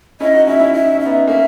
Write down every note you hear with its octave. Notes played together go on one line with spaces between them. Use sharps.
C#4 E4 D#5
D#4 F#4
C#4 E4 E5
C#4 E4
E4 E5
D#4
C#4
E5
B3 D#4
A#3 C#4 E5